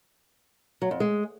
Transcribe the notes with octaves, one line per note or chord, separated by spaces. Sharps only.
F#3
F2
G#3